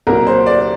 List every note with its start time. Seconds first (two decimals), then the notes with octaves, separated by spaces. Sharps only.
0.07 C2 A#2 F#3 A#4
0.27 C5
0.46 D5